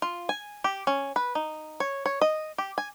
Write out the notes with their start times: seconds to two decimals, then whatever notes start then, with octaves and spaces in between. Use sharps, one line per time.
0.02 F4
0.29 G#5
0.64 G4
0.87 C#4
1.16 B4
1.35 D#4
1.80 C#5
2.06 C#5
2.21 D#5
2.58 G4
2.78 G#5